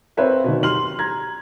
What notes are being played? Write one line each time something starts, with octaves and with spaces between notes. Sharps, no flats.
C4 A#4 B4 C#5 E5 F5
B2 D#3
G4 C6 F6 F#7
A#5 G#6